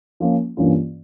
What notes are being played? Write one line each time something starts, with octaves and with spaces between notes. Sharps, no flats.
F3 A#3 C#4 F4
G2 E3 A#3 C#4 F4